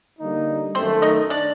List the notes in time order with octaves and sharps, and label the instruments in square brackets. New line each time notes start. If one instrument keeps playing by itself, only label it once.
[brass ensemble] D3 G3 A#3 D#4
[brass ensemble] F#2 D#3 A3 [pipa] C4 C5
[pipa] D#4 D#5
D4 D5